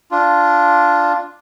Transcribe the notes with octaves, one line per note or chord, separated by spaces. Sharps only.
D4 F4